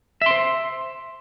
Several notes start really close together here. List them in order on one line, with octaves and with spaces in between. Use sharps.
E5 C6 C5